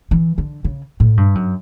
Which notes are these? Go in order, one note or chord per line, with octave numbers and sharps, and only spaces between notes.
E3
D3
C#3
A2
G2
F#2